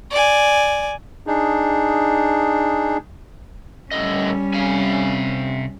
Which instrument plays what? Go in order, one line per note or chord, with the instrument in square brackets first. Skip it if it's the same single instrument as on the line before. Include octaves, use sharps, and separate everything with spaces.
[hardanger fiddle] D5 G#5
[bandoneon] D4 D#4 G#4
[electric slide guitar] A2 D3 D#5 [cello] G3 C#4
[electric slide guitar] C3 F5 G#5